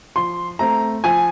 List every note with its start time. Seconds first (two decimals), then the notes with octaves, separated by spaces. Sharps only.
0.16 F3 C6
0.59 A3 C4 A#5
1.04 F3 G#5